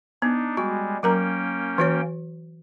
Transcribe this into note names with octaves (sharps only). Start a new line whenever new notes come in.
B3 D4 D#4
G3 G#3 F#4
F#3 A#3 C#4 A#4 G5 A#5
E3 F#4 C#5